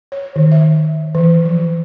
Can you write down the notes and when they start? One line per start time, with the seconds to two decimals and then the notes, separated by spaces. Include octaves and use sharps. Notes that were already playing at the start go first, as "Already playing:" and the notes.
0.12 C#5
0.36 D#3
0.52 E5
1.15 E3
1.45 F3